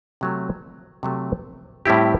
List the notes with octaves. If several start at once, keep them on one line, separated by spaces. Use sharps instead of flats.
C3 F#3 A3
C3 F#3 A3
A2 G3 C4 E4 G4